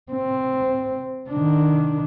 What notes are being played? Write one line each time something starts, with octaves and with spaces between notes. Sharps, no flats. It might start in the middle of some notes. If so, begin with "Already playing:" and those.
C4
D#3 D4